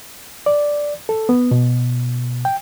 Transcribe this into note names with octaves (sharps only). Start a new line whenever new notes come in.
D5
A4
B3
B2
G5